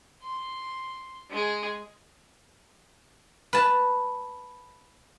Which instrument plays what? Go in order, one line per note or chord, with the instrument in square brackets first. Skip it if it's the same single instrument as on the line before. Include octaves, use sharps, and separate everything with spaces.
[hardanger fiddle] C6
G#3 G#4
[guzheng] B4 A5